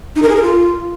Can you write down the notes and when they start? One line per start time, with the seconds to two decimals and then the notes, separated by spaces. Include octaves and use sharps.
0.16 D#4
0.22 A#4
0.29 G#4
0.35 A#4
0.42 F4